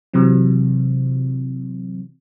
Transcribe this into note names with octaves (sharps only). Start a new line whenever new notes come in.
C3 E3 F#3 C4